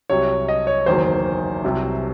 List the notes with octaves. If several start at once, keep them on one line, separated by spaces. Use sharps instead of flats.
C2 C3 F#3 C#5
D#5
C#5
F#1 E2 D#3 F#3 C5
C2 C3 F#3